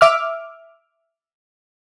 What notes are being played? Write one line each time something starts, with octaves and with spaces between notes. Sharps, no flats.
E5 D6 F6